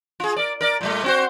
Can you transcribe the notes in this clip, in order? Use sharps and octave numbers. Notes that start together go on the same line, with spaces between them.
F4 G#4
A#4 D5
A#4 D5
A#2 G3 A3
C4 F#4 C5